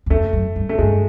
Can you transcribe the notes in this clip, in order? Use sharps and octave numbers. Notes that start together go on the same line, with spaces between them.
F#2
F2 A3
F#2
G2
A3
G2 G#3